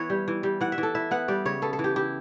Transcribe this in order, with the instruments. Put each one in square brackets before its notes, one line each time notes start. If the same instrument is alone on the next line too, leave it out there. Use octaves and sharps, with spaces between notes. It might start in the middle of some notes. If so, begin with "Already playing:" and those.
Already playing: [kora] E3 B3 B4 C#5
G3
E3
G3
E3 F#5
E5
E3
A4
E4 E5
B3 F#5
G3 D5
C#3 C#5
B3 A4
A4
E3
G4
E4 G4